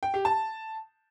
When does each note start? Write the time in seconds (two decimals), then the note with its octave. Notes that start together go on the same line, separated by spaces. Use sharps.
0.03 G5
0.14 G4
0.25 A5